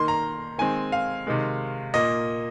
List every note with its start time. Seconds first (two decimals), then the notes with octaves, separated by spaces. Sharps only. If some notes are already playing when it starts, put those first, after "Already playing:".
Already playing: D#3 A#3 C6
0.08 A#5
0.58 D#3 G#3 C4 G#5
0.92 F5
1.27 C3 D#3 G#3
1.94 A#2 A#3 D#5